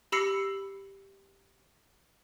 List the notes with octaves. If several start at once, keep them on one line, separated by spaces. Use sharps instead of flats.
G4 B5 E6 A#6 C7 C#7